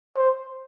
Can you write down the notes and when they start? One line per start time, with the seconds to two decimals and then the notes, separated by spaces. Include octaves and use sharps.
0.16 C5